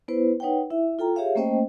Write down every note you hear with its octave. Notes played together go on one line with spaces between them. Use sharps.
B3 E4 B4 C5
D#4 B4 C#5 F#5 G5
E4 E5
F4 A4 G5 A#5
G4 G#4 C#5 E5 F5
A3 A#3 C#4 C5 D#5 G5